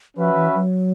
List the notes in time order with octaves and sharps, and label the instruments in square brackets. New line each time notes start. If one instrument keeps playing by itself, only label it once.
[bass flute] F3 [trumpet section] C#4 F#4 B4 E5
[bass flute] E3
F#3